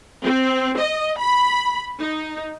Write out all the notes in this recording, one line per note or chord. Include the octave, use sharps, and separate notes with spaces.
C4
D#5
B5
D#4